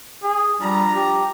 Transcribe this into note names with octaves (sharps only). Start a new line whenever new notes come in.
G#4
F3 G3 D4 A#5
G4